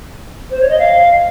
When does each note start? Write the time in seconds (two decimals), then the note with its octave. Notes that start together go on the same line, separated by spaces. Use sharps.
0.50 C5
0.61 C#5
0.69 D#5
0.79 F5